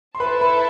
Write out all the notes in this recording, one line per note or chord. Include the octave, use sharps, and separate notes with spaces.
C6
E4 A4 B4 E5 A5 B5
B4 B5